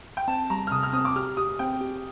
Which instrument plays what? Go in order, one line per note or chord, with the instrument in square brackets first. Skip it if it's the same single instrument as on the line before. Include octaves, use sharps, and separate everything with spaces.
[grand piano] G5
[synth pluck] C4 [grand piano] A5
[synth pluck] G3 [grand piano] A#5
[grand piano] F6
[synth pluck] C3 [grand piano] D#6
[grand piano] F6
[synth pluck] C4 [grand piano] D#6
[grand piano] D6
[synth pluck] G4 [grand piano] F6
[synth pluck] G4 [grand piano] D#6
[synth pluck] C4 [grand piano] G5
[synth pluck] G4